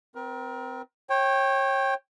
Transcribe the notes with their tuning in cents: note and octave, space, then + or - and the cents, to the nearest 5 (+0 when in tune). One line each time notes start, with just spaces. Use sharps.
C4 -20 A#4 +30
C#5 -30 G5 +0